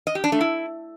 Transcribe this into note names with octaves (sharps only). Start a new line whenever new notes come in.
D#5
G4
D4
A3
E4